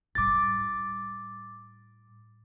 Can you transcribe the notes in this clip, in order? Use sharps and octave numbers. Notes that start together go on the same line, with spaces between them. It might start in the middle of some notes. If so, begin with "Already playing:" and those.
A2 G3 D6 A6